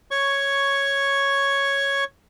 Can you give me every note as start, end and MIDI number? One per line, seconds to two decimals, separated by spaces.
0.11 2.04 73
0.11 2.04 85